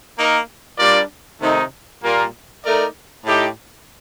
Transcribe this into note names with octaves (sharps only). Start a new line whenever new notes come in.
A#3 D#4 A#4
G3 D4 F4 A#4 D5
C3 D#3 A3 D#4
A#2 G3 A#3 F4 A#4
A3 D#4 A#4 D5
A2 A3 D#4 G4